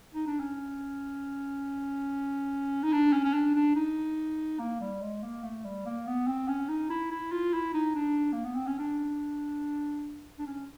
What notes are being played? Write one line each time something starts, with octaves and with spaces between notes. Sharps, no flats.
D#4
D4
C#4
D#4
D4
C#4
C#4
D4
D4
D#4
A#3
G3
G#3
A#3
A3
G3
A#3
B3
C4
C#4
D#4
E4
E4
F4
E4
D#4
D4
A#3
B3
C4
C#4
D4
D4
C#4